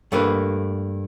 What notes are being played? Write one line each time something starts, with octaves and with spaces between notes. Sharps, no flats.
G2 A3 A#3 B4